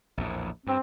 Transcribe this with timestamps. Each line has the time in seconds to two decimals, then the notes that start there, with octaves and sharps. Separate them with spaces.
0.17 A#1 E2 A2
0.67 G2 C4